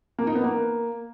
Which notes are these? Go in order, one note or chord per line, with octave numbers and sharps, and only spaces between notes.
A#3
D#4
B3
A#3